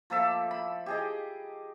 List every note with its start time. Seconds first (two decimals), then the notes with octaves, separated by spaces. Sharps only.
0.10 F3 A#3 A4 E5
0.51 B5
0.86 G4 G#4 D#5